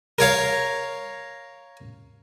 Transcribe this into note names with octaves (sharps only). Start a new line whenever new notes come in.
A#4 C#5 F5